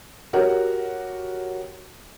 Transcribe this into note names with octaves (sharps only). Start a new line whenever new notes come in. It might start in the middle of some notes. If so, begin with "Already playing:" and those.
F#4 G4 A#4 C#5